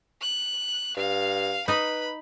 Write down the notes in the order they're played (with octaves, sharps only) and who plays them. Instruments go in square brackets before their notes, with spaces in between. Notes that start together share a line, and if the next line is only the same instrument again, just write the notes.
[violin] F#6
[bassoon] G2 [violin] F5
[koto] D#4 D#5 [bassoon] B4 [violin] B5